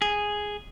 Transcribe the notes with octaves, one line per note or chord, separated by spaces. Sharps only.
G#4